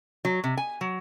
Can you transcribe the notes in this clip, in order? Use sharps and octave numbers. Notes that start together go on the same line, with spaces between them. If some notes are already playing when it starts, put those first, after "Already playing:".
F#3
C3
G#5
F#3